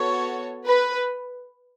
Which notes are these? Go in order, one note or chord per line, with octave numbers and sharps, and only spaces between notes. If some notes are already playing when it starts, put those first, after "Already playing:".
Already playing: B3 F#4 A4 C#5
B4